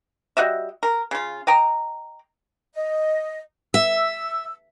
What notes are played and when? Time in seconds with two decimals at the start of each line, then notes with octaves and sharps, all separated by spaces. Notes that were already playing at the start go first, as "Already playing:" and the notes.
0.37 G3 F#4 D#5 E5
0.83 A#4
1.11 C#3 F4
1.47 D#5 G5 A#5
2.75 D#5
3.74 E5 E6